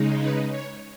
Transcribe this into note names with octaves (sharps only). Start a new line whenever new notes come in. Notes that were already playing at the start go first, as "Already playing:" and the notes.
Already playing: C#3 G#3 D#4
B4
C#5